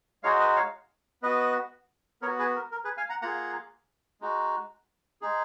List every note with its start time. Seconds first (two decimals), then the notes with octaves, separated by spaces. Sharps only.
0.24 G#3 D#4 F#4 C#5 F5
0.40 B4 D#5
0.56 C#5 F5
1.22 B3 F#4 B4 D#5
2.22 B3 A#4 C#5
2.27 F#4
2.39 G#4 B4
2.56 A#4
2.72 A#4
2.84 G#4 B4
2.97 F5 G#5
3.09 F#5 A#5
3.22 A#3 F4 G#4 F#5 A#5
4.21 G#3 D#4 F#4
5.21 G#3 D#4 G#4